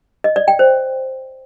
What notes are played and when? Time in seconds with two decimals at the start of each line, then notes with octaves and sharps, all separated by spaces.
0.24 D#5
0.36 D5
0.48 G5
0.59 C5